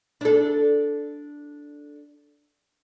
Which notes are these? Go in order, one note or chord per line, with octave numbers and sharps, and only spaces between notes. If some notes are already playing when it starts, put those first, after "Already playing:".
D4 A4